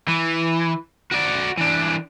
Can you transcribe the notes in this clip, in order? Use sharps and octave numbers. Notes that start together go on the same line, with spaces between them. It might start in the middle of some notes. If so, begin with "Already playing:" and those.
E3
F#4 D5
E3 D4